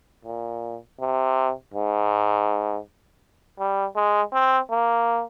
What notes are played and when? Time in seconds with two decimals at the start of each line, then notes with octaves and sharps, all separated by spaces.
0.25 A#2
1.00 C3
1.74 G#2
3.59 G3
3.96 G#3
4.33 C4
4.70 A#3